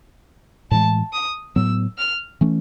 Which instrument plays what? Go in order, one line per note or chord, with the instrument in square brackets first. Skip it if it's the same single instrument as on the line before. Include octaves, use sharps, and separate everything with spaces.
[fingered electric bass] A2 E3 G#3 [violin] A5
[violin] D#6
[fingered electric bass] A2 F#3 B3 [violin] E6
[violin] F6
[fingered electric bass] E3 A3 C#4